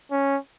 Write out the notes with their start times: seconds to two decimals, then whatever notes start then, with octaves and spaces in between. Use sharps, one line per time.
0.12 C#4